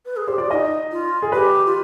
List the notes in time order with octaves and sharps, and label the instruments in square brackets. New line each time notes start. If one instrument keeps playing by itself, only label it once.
[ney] B4
G#4
[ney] G4 [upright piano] C5
[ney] F4 [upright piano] D5
[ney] D#4 F4 [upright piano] D#5
[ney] F4
[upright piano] G#4
[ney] G4 [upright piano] B4
[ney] F4